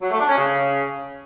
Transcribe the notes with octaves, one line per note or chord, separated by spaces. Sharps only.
F#3
A3
D4
C#4
C#3